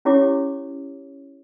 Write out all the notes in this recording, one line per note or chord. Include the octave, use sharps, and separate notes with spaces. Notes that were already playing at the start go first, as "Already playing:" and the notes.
C#4 E4 G4 C#5 D6